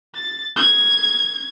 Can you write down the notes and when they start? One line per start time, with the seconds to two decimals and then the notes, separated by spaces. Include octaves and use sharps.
0.15 A6
0.56 G#6